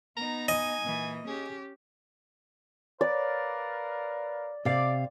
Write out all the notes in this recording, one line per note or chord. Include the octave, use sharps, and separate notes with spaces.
B3 D#4 A#5
D#5 G#5
A#2 E3
C#4 G4 G#4
A#4 B4 D5 F5
C3 D5 F5